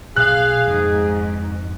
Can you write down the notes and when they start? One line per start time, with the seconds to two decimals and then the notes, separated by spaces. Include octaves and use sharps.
0.16 B1 B2 B3 G#4 F5 F#6
0.67 F2 G#2